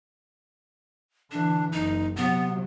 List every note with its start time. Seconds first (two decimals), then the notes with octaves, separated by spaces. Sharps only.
1.32 D3 E3 D4
1.72 F#1 D#4
2.16 C3 F#3 B3